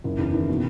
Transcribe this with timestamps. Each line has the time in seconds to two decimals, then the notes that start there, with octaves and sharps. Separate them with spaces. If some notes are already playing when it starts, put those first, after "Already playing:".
0.04 F#1
0.18 E2
0.34 D#3
0.49 B2